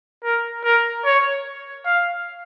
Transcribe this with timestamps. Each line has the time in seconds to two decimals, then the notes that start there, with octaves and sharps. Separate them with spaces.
0.24 A#4
0.64 A#4
1.05 C#5
1.86 F5